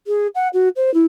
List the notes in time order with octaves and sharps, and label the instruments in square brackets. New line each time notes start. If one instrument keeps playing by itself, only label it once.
[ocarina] G#4
F#5
F#4
C5
E4